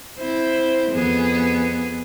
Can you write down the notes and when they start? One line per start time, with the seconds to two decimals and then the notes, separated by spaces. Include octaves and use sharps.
0.19 C4 E4 C5
0.92 F2 B3 G#4